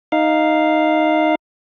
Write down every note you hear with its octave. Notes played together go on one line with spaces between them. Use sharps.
D#4 F5